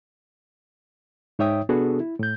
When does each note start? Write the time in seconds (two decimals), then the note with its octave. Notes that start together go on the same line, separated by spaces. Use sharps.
1.39 G#2 D#4 C#5 E5 G5 D#6
1.69 C3 B3 D4 F#4 G#4 A4
2.00 E4
2.19 A2 G6